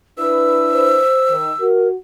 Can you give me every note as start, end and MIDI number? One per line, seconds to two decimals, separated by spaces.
0.18 1.00 62
0.18 1.00 64
0.18 1.00 71
0.18 1.65 88
0.72 1.34 72
1.30 1.52 51
1.60 1.94 66
1.60 1.88 70